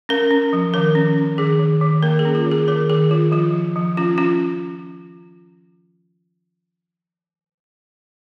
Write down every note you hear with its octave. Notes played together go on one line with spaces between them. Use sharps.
C#4 A#4
C#4
F3
D#3 A#4
C#4
C#4
D#3 G#4
D#3
D#3
A#3 A#4
G#4
C#4
F4
D#3
G#4
D#3 A#4
D#3 G#4
D#3 F4
F3 F4
F3
F3
C#4 F4
C#4 F4